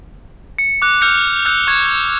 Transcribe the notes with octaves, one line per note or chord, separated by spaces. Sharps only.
C#7
D6 F#6
F6 G6 C#7 F7
E6 F#6 G6
C#6 G#6